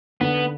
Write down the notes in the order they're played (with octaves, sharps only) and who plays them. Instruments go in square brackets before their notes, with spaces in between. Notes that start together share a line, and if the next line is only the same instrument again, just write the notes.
[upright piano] D3 [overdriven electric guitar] B3